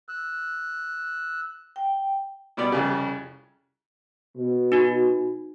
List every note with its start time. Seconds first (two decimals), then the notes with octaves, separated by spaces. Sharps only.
0.09 E6 F#6
1.76 G5
2.57 B2 G3 B3 D5
2.72 C2 F2 C#3
4.37 B2
4.72 D#4 F#4